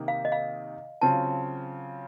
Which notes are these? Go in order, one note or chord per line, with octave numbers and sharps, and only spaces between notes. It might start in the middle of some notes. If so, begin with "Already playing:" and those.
Already playing: C3 D#3 A#3 D#4
F5
D#5
F5
C#3 F#3 C4 F4 A5